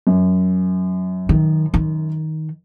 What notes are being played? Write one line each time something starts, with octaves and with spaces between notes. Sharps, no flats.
F#2
D#3
D#3